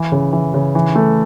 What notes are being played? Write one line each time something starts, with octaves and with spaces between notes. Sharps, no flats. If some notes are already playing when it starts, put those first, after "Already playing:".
Already playing: E3
C#3
E3
C#3
E3
A3